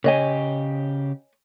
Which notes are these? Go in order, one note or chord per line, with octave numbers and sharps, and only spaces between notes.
C#3 G4 C#5 D#5 G#5